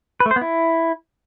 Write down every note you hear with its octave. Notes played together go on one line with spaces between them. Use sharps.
B4
A3
C5
B3
E4